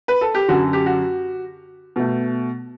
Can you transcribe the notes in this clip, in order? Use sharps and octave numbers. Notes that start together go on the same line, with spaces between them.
B4
A4
G4
F#2 D3 F#3 F#4
G4
F#4
B2 A3